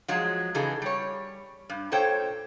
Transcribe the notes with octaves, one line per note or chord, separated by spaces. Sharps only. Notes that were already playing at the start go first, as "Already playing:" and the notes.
F3 F#3 G#3 G#4
C#3 E3 D#4 G#4 A4
G3 C#5
G2
A#2 A4 C5 C#5 G5